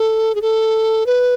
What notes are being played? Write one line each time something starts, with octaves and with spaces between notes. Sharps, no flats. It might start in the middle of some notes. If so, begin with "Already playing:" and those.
Already playing: A4
G#4
A4
B4